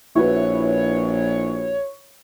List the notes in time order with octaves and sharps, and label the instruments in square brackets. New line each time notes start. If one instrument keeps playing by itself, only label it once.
[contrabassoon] A#1 [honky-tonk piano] E4 F#4 B4 [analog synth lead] C#5